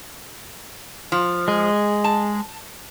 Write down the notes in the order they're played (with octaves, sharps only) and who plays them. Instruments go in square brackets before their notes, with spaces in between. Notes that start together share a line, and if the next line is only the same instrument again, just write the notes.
[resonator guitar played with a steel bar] F3
[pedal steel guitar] G#3 G#4
[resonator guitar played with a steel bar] A5